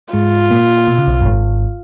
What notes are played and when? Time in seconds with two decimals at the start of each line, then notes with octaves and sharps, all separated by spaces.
0.13 G#2 G#3 F4
0.51 A#2 A#3
0.88 B2
0.98 C#3
1.07 B1 B2
1.21 F#2
1.25 G#1 G#2